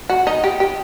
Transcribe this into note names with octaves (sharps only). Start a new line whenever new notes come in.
F#4
D#4
G4
G4